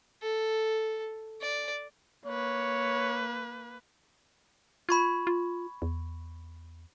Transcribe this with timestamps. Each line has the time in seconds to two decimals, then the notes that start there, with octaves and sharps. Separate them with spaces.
0.22 A4
1.41 D5
2.26 A#3 B4 C#5
4.89 F4 B5 C#6 G#6
5.27 F4
5.82 E2